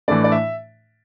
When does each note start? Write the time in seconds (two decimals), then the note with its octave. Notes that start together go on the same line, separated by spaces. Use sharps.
0.08 A2 E3 A3 D4 D5
0.24 D5
0.32 E5